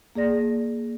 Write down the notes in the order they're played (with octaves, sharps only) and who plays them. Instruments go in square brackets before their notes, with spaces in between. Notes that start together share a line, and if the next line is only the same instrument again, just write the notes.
[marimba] A#3 G#4 D5 A#6